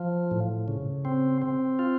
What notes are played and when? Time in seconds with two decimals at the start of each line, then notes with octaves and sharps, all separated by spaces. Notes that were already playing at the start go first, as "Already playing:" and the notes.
Already playing: F3
0.31 A2
0.68 C#3
1.05 C4
1.42 C4
1.79 F4